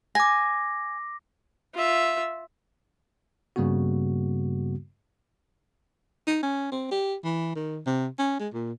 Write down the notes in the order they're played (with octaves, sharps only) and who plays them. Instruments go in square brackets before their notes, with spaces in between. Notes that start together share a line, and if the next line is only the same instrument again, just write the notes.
[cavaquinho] G#5 [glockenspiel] D6 A#6
[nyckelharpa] F4 E5
[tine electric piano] G2 C#3 G3 A#3 B3 F#4
[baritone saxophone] D#4
C#4
C4
G4
E3
D#3
C3
C#4
G#3
A#2